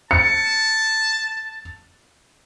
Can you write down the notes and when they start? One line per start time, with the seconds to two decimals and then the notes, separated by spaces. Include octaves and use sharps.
0.11 A5 C#7